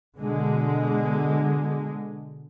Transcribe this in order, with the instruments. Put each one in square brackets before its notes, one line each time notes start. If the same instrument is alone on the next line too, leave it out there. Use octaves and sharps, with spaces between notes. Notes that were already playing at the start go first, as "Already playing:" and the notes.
[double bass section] B2 D3 G#3